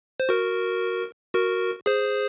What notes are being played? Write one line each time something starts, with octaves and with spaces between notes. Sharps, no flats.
C5
F#4 A#4
F#4 A#4
G#4 C5